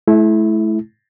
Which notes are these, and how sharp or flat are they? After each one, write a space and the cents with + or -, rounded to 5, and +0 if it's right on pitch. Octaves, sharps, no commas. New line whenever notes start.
A3 -40 E4 +0